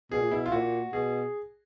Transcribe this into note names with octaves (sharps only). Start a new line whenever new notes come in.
B2 G#4
A#2
B2 E4
F4
A#2 F#4
B2 G#4